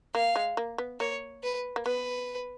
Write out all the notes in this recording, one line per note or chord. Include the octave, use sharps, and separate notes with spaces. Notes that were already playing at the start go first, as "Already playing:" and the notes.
A#3 F5
G#3
A#3
B3
A#3 C#5
B4
A#3
B3 B4